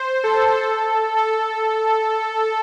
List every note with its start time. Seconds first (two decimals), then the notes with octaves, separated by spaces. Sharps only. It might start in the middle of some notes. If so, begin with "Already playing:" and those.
Already playing: C5
0.24 A4
0.54 A4
1.16 A4